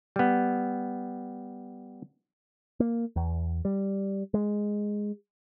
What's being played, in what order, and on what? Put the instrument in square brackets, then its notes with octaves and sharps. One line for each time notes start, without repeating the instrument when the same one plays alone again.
[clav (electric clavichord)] G3 B3
[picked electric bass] A#3
E2
G3
G#3